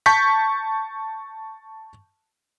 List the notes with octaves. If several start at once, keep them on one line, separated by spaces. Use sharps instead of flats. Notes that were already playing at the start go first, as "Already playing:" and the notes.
A5 C#6 G6 B6